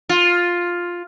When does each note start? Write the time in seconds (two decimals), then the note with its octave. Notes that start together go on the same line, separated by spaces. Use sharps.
0.09 F4